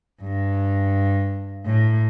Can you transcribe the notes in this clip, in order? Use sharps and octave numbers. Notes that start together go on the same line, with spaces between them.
G2
A2